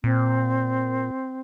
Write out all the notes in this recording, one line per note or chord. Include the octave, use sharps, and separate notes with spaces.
A#2 C4